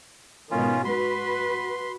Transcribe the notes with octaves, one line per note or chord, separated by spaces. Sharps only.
G#2 B2 D#3 C#4 F4
F#4 B4 C6